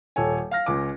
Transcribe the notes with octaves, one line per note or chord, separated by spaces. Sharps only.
D#1 A4 C#5 G#5
F5 F6 A#6
C#2 C#4 D6